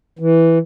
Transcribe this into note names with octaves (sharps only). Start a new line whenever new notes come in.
E3